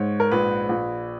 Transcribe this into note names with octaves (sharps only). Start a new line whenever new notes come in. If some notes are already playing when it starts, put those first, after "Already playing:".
Already playing: G#2 C#5
A#4
A#1 B4
A#1